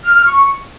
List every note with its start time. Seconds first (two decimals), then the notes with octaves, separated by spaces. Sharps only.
0.05 F6
0.15 F6
0.26 C#6